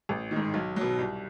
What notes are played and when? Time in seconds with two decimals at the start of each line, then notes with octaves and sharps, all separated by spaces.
0.09 A1
0.31 D#3
0.36 G#2
0.54 B1
0.76 B2 F#3
0.98 C2